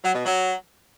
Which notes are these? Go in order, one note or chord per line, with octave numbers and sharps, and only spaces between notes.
F#3
B2
F#3